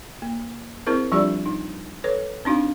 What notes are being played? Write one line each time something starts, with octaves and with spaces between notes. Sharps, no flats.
A#3
C4 E4 G#4 A#4 C5
F3 G3 D4 F4 G4 D5
D#4
A4 B4 C#5
C4 D4 D#4 F#4 F5